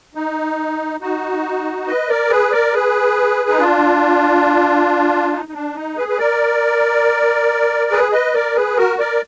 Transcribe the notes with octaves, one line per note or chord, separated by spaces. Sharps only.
D#4
D#4 F#4
B4 D#5
A#4 D5
G#4 B4
A#4 D5
G#4 B4
D#4
D4 F4
D#4
D#4
D4
D#4
G#4 B4
B4
A#4 D5
G#4 B4
B4 D#5
A#4 D5
G#4 B4
F#4 A#4
A#4 D5